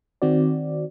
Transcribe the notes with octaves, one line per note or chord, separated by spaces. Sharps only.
D#3 C4 F#4 D5